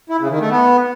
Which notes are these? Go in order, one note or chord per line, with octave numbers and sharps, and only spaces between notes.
E4
C#3
D#3
A3
B3